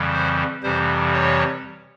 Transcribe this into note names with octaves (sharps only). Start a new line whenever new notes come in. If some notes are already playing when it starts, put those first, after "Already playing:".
Already playing: F2 C#3 E3 G3
C5
F2 C3 E3 G3 C5
C#5